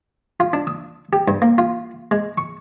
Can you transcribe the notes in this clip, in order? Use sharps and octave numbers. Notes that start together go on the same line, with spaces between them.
F4
D4
D#6
G4
G2
A#3
F4
G#3
C#6